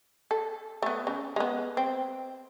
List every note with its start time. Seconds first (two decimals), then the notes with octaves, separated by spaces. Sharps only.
0.31 A4
0.82 A3 B3
1.07 C#3
1.36 G#3 B3
1.77 C4